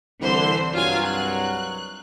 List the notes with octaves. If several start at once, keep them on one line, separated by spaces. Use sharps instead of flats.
C2 D3 E3 C5 C6
C2 G2 F#3 F4 F5 G#5
F#6